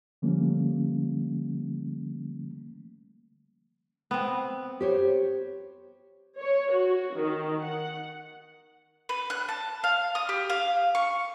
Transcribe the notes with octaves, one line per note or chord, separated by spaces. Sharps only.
D3 F3 G3 A3 A#3 C#4
B3 C4
G4 C5 C#5
C#5
F#4
D#3
F#5
B4
F#6
A5
F5
D#6
G4
F5
C#6